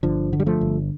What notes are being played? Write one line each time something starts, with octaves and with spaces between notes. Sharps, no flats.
G1 D3 F3
D3
G3
F3 A3
G1